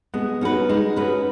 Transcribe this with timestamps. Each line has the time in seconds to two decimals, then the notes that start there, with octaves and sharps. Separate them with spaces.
0.14 G#3 B3
0.41 C#4 D#4 F#4 B4
0.69 G#3 D#4
0.96 C#4 F#4 B4